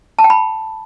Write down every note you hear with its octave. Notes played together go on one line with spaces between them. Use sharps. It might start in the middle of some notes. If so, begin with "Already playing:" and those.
A5
G5
B5